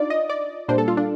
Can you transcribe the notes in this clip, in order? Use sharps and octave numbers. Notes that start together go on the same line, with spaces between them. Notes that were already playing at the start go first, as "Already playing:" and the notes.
Already playing: D4 D#4 F4 D5
D#5
D5
A#2 G3 A#3 D4 C5
A4
F4
D4